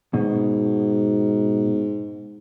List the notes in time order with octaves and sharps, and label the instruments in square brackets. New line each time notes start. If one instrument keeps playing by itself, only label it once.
[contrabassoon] G#2 [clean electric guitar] B2